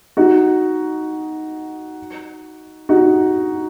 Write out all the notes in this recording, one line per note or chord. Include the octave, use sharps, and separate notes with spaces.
D#4 F#4
D#4 F#4